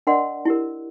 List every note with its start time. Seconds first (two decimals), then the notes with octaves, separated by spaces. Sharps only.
0.07 D4 A#4 D5 D#5 F#5 C6
0.45 E4 G4 A#4